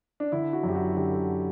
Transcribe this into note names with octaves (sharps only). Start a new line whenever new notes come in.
D4
D3 E4
F#4
F#2
G4
F#4
D3 G4
A4